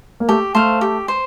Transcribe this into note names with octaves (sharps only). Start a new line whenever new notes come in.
A#3
A3 G4
A3 C5 F5
G4
C5